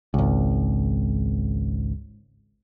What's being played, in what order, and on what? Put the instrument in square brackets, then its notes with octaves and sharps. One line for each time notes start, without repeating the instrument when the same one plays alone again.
[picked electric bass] G#1 C#2